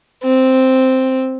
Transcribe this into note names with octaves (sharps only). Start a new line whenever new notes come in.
C4